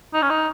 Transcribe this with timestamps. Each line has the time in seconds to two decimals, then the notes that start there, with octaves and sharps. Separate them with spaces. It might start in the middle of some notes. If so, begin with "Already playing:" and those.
0.14 D#4
0.22 C#4
0.30 D#4